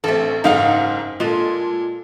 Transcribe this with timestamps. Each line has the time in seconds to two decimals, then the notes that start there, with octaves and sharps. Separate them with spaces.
0.04 A1 A3 C4 A4
0.44 F#1 G#2 D#4 F5 F#5
1.20 A#2 G#3 F4 A4